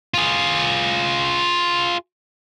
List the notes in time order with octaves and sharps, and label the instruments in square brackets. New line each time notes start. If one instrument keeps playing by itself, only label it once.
[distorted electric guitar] F4 G#4